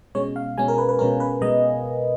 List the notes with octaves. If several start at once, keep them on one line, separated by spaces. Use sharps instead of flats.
B2 G#3 C#4 C#5
F5
B2 G#3 C#4 G#5
A#4
B4
B4
B2 G#3 C#4 A#4
B4
B2 G#3 D#5